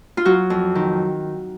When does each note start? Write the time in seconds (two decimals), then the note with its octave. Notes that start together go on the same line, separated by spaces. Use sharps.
0.17 F4
0.25 F#3 F#4
0.50 F2
0.75 D#3